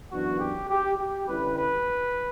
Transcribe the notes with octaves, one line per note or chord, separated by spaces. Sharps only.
F#2 E3 B3 D4 F#4
G4
G4
G4
D3 G3 C#4 E4 B4
B4